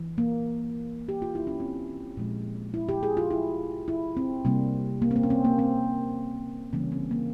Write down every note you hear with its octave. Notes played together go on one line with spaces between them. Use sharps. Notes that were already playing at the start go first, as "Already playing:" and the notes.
Already playing: E3
A#3
G4
F4
E4
C#4
C4
A#2 F3 G#3
E4
G4
G#4
F4
E4
E4
C4
C3 G3 A#3
A#3
C4
A#3
C#4
C4
A#3
C4
C#3 E3 G3 A#3 C#4
C4
A#3